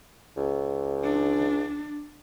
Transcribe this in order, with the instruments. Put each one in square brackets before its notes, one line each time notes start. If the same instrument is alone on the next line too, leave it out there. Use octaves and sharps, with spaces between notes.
[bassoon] C#2
[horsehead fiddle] D4